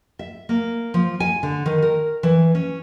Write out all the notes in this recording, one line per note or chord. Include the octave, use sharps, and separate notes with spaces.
E5
A#3
F3
G#5
D3
D#3
A#4
E3
C#4